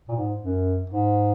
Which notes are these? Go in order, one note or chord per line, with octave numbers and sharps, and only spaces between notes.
A#2
G#2
F#2
G#2